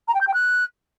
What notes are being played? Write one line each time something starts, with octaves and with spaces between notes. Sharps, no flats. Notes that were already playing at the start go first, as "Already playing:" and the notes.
A#5
G5
G6
G5
F#6